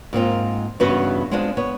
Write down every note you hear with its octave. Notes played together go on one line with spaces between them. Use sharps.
G#2 A#3 C4 F4
G2 C#3 E3 B3 F#4 B4
G#3 B3 C4 D4 F4
B3 C#5